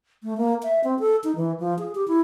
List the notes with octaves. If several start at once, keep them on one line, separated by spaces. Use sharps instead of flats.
A3
A#3
E5
C4
A4
D#4
E3
F3
G#4
G4
E4